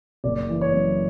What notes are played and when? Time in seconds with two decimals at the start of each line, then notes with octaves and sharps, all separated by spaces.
0.24 F#1 D5
0.49 E3
0.61 C#5
0.74 F#2